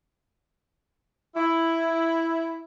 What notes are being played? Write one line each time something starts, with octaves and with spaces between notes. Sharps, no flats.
E4